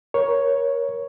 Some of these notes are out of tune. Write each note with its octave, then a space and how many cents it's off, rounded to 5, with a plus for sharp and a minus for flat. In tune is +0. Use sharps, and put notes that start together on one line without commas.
A#4 +25 C#5 +0